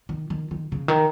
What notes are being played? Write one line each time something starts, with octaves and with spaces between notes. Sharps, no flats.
D#3
D#3
D#3
C#3
D#3